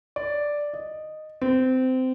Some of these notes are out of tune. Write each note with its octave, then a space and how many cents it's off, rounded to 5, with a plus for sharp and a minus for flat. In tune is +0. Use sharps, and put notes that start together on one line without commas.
D5 +0
D#5 -10
C4 -20